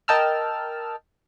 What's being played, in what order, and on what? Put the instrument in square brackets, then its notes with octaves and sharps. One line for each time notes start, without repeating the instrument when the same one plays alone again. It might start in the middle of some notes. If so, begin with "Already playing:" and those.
[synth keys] A#4 D#5 G5 A5 E6 F6